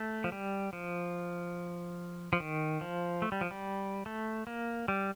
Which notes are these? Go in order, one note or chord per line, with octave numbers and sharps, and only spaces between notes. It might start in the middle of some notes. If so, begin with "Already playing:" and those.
Already playing: A3
F3
G3
F3
F3
D#3
F3
A3
G3
F3
G3
A3
A#3
G3